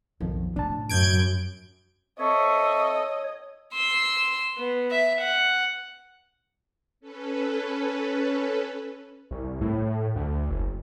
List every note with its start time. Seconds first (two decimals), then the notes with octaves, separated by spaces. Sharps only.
0.20 B1 F2 D#3 F3
0.56 A2 C#3 D4 A5
0.89 F#2 G6 G#6 D7
2.20 C4 A4 C#5 D#5 E5 C#6
3.74 C6 E6
4.57 B3
4.91 E5
5.21 F#5
7.00 C#4 A4 B4
9.31 C2
9.61 A2
10.16 D2
10.50 F#1